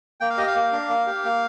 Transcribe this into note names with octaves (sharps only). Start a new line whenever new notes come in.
A#3 G5
F5
G4 D#5
F5
A#3
D4
A#3
G4
A#3